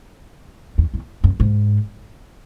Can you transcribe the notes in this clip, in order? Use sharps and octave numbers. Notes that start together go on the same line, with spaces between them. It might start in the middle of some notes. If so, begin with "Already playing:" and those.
E2
E2
F#2
G#2